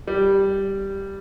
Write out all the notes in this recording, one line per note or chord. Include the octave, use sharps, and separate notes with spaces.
G3